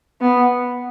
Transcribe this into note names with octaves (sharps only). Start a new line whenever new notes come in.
B3